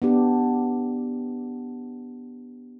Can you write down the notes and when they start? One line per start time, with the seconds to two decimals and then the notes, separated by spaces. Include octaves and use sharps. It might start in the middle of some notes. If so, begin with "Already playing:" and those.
0.02 B3 D4 G4